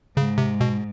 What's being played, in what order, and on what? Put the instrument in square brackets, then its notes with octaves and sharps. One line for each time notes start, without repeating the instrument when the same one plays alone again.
[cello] G#2 [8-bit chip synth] C#3
[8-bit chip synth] C3
B2